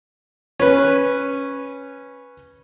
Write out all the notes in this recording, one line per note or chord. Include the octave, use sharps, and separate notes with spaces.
C#4 B4